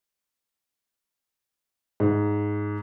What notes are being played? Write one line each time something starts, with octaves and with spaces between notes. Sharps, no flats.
G#2